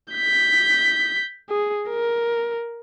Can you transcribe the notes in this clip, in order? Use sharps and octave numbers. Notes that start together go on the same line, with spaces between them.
G6 B6
G#4
A#4